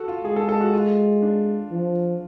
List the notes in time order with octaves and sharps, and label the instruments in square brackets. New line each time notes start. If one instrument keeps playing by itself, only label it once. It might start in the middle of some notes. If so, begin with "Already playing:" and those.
Already playing: [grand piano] F#4 A4
F4
[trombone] G#3 [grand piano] G#4
[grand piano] A4
A4
F#4
F4
D4
[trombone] F3